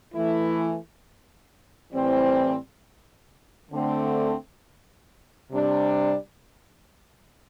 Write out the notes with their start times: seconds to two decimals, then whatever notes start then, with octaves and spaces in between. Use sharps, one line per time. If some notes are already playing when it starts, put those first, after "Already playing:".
0.13 E3 A3 E4
1.93 A2 E3 G3 C4
3.72 D3 A3 C4
5.51 C3 G3 D4